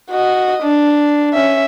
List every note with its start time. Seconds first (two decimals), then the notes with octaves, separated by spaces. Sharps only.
0.11 F#4 D#5
0.63 D4
1.34 C#4 E5